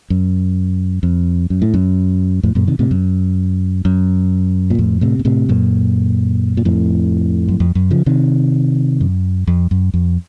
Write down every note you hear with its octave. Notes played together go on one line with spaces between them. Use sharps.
F#2
F2
F#2
A2
F#2
F2 A2
F#2 A#2
C3 D#3
A2 C3
F#2
F#2
A#2
F2 A2
A2 C3
A#2
A2 C3
F#2 A#2
A#2
F2 A2
F#2
F2
F#2
C#3 F3
C3 D#3
F#2
F2
F#2
F2